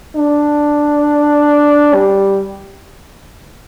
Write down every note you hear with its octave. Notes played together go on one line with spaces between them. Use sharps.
D4
G3